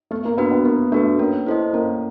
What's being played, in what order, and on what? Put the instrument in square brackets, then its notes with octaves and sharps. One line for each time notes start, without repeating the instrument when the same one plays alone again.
[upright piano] A3 [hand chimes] B3
[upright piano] A#3
[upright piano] B3 [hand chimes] D4 F#4 B4
[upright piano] B3
[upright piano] A#3 [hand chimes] B3
[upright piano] A3 [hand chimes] D4 F#4 B4
[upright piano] A#3 [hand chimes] C#4
[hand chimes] E4 A4 C5 D#5
[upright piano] A#3 [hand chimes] C#4